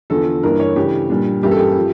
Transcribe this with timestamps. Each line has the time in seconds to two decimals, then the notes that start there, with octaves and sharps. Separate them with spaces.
0.10 E2 D3 F3 A4
0.43 G2 E3 A#3 D4 A#4
0.60 C#5
0.76 C#3 E3 A3 D4 G4
1.10 A#2 G3 D4
1.43 G2 E3 A#3 C#4 E4 G4
1.51 A4
1.59 G4
1.77 F3